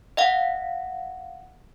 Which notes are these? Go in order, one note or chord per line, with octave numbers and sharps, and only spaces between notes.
D#5 F5 F#5